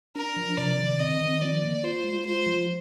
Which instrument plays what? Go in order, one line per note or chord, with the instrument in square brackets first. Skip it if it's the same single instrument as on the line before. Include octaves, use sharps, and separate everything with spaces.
[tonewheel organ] D4 [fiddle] A#4
[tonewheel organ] F3
[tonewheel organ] C3 [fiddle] D5
[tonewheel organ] D#3
[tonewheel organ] C4 [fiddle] D#5
[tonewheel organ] D#3
[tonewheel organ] F3 [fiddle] D5
[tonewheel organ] A#3
[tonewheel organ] F4 [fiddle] C5
[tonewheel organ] G#3
[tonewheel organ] F4 [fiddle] C5
[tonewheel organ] F3